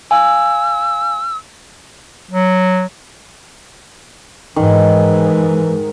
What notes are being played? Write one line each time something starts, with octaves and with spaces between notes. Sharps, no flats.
F5 G#5 E6
F#3
G#2 D#3 E3